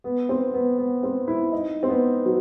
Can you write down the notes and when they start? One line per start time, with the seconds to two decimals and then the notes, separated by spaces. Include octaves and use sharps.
0.04 B3
0.29 C4
0.54 B3
0.78 B3
1.03 C4
1.28 E4
1.52 D#4
1.83 C4
1.89 B3
2.26 F#3